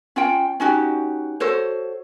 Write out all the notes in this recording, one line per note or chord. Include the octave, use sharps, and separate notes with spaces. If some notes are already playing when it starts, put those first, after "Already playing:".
C#4 F4 G5
C#4 D#4 F#4 G4
F#4 A4 C5 C#5